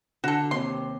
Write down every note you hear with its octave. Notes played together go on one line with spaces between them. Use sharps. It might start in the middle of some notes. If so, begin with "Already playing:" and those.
D3 F#4 A4
D#2 C3 C6